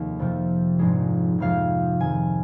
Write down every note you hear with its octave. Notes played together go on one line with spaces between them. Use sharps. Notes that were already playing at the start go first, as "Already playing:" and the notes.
Already playing: F1 D#2 D#3 G#3
F2 C3 F3
A#1 G#2 F3 G#3
F1 F2 C3 F3 G#3 F5
F2 D#3 G#3 G#5